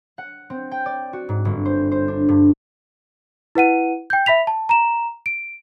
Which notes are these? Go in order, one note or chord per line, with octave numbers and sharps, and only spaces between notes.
F#5
C4
G5
D5
F#4
G#2
G1
C5
C5
D4
G2
E4 B4 F#5 D#7
G5 G6
E5 B5 B6 F7
A5
A#5 E7
D7